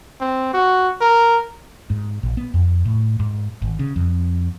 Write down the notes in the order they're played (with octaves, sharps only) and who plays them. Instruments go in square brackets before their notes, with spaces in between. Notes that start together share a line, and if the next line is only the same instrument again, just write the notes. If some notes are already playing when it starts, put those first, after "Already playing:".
[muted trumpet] C4
F#4
A#4
[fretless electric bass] G#2
A#1
B3
F2
A2
G#2
G#1
C#3
F2